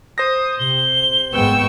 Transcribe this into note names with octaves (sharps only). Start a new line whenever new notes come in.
C5 D#6 A#6
C3 G7
G#1 G#3 B3 G5 C#6 E6